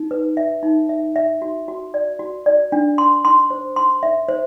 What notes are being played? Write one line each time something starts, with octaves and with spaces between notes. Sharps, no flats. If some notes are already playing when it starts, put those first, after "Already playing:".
Already playing: D#4
B4
E5
D#4
E5
E5
F#4
F#4
D5
F#4
D5
D4
C6
C6
C5
C6
E5
C5